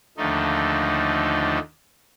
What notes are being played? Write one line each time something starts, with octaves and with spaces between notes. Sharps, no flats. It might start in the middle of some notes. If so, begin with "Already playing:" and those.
D#2 D3 F3 A3 D#4